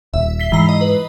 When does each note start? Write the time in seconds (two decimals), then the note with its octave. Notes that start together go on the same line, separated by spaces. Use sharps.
0.14 D#1 E5
0.39 B6 C7 G7
0.52 G#2 E3 A#5 C7
0.69 D#5
0.81 B4